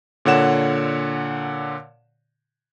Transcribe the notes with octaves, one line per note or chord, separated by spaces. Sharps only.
A#2 D3 C#5 F#5 E7